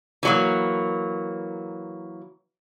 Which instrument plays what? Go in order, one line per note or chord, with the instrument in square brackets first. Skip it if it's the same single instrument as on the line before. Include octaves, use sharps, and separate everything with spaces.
[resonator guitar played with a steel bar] E3 F#3 A#3